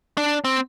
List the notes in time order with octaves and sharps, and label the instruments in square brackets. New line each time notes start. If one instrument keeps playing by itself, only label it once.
[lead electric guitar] D4
C4